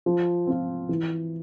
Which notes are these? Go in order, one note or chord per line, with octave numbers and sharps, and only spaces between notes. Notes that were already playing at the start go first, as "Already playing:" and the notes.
F3
C4 F4
E3